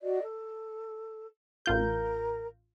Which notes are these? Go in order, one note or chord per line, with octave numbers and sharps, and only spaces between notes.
F#4 D5 D#5
A4
A1 F4 A#4 G6